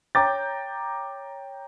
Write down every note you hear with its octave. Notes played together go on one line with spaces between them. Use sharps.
C#5 G5 A#5 D6 G6 A6